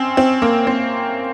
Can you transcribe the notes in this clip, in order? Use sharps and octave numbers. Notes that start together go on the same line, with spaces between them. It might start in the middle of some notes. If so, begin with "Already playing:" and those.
Already playing: C4 C#4
C4
A#3
C4